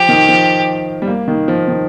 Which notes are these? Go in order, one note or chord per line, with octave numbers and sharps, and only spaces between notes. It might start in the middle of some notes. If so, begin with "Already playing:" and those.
Already playing: F3 G4
D#3
F3
G3
A#3
D#3
F3
D#3